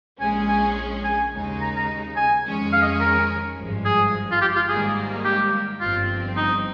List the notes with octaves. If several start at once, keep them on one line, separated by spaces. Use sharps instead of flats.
A#1 A#2 G#3 C#4 G#4 G#5
G#5
G#5
D#2 C#3 G#3 D#4
A#5
A#5
G#5
F2 D#3 G#3 C#4
F5
D#5
A#4
G#1 G2 F3 G#3
G#4
F4
G4
F4
G#2 D#3 G3 A#3 G#4
G4
G1 G2 F3 C4 F4
D#4